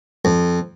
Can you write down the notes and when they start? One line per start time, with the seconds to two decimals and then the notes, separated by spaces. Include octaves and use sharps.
0.25 F2